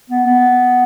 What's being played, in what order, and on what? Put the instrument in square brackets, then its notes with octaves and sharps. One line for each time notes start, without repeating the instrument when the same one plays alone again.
[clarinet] B3
B3